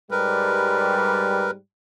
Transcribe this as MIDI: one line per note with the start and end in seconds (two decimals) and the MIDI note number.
0.11 1.56 44
0.11 1.56 55
0.11 1.51 70
0.11 1.51 71